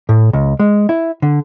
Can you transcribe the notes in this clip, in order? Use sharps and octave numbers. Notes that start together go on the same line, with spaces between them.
A2
C#2
G#3
E4
D3